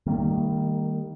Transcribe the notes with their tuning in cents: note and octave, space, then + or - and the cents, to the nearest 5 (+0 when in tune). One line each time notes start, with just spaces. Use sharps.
D#3 +0 G3 +10 A#3 -35